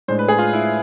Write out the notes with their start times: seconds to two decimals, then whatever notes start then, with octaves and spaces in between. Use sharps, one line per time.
0.08 A2 G#3 D4 C5
0.19 B4
0.28 G#4
0.39 F4
0.53 E4